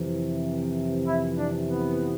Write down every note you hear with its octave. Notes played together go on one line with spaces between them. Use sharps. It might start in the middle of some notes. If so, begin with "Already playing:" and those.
Already playing: F2 C3 E3
E4
D4
B3